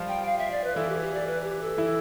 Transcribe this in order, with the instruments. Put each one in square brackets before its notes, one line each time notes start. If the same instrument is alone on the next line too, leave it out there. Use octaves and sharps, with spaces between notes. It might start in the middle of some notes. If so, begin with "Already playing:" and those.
Already playing: [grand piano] F3 G3 F4
[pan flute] G5
F5
E5
D5
B4
[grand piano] E3 E4 [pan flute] A4
[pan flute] G4
G4
D5
B4
G4
A4
[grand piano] E3 E4